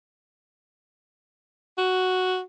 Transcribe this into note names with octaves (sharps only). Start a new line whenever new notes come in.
F#4